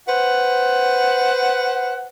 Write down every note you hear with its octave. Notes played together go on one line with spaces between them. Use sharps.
B4 C5 F#5